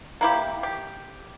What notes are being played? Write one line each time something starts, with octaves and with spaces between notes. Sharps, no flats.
A#3 E4 G4
G4